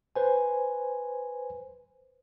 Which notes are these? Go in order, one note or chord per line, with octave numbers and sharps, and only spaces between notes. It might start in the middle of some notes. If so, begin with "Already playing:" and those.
B4 C5 G#5